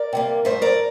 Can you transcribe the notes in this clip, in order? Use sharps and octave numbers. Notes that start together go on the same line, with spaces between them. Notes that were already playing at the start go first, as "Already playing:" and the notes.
Already playing: A#4 D5
C3 G3 A#3
G2 F3 A3 C5 E5
A#4 D5